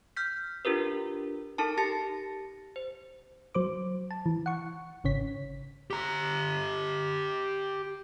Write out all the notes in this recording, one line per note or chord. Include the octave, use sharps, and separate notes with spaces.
F6 G6 B6
D4 F4 G4 A#4 B4
D#4 A4 A#4 A5
G4 A5 A6 A#6 C#7
C5
F#3 C5 D6
A5
E3
F#5 C#6
G#1 C#3 C#5 B6
G4 A#5